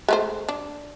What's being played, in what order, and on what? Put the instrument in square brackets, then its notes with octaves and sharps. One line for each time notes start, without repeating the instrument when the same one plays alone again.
[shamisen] G#3 A3 C5
D4